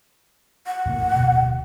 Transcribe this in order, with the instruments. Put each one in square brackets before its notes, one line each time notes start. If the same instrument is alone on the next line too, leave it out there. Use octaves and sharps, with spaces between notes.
[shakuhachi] F#5
[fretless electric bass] F2 A2 A#3
D1 B2 A#3